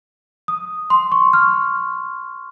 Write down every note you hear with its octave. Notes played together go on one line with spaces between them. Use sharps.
D#6
C6
C#6
F6